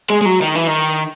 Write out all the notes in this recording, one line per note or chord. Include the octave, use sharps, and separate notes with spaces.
G#3
G#3
F#3
D#3
E3
D#3